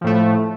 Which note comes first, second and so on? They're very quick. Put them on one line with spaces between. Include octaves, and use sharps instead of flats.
F3 A2 A3